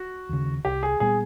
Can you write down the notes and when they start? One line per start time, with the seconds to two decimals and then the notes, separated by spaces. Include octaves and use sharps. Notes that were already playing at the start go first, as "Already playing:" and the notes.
Already playing: F#4
0.29 D#2 C#3
0.65 C2 G4
0.83 G#4
1.00 A#2 G3 B3 G#4